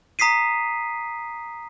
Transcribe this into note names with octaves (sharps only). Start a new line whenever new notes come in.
A#5 D#6 B6 C7 D#7